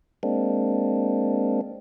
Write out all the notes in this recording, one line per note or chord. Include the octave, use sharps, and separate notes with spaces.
G#3 A#3 C4 D4